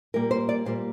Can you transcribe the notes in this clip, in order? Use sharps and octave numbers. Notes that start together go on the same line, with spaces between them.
A#2 G3 A#3 A#4
C5
D5
A#2 G3 A#3 C5